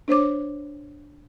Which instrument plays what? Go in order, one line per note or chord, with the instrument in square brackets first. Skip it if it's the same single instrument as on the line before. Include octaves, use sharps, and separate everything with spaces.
[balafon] D4 C5 C#5 D6